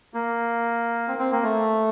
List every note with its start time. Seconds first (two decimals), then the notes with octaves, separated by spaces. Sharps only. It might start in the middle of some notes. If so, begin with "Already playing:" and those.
0.14 A#3
1.08 C4
1.19 C4
1.32 A#3
1.43 A3